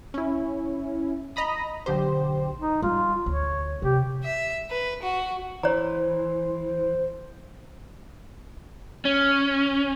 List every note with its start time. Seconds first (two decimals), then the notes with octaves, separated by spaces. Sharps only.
0.14 C#4 E4
1.36 D#5 A#5 B5 D#6
1.86 B1 D3 G4 C5
2.60 D#4
2.82 G3 F4
3.26 D2 C#5
3.82 C3 G4
4.23 E5
4.70 B4
5.02 F#4
5.63 E3 C5 C#5 A#5
9.05 C#4